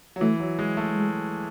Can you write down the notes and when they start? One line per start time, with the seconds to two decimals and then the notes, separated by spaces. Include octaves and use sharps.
0.16 F#3
0.21 E3 A3
0.40 F#3
0.59 G#3
0.77 A3
0.95 G#3